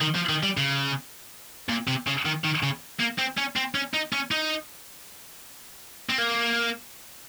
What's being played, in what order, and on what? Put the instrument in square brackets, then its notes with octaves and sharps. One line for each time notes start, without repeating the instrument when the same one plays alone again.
[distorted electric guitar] D#3
F3
D#3
G3
C#3
A#2
C3
C#3
D#3
D#3
C#3
A#3
C4
C#4
C4
C#4
D#4
C#4
D#4
C4
A#3